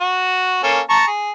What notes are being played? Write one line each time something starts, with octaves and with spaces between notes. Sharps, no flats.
F#4
A#3 C#4 A4
A5 A#5 C#6
G#4